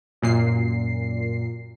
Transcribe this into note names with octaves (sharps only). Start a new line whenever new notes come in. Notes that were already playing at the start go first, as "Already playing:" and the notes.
F#2 A#2 C7